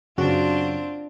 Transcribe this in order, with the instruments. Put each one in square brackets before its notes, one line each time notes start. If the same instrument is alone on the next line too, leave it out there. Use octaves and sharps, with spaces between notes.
[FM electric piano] F#2 C#3 F#4 [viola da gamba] C4 D4 F4